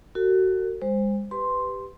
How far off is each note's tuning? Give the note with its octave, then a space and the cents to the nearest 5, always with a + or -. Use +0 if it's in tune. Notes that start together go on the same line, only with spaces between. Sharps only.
F#4 +20 A4 +45
G#3 -40 C5 +0
G4 +0 B4 +15 C6 +0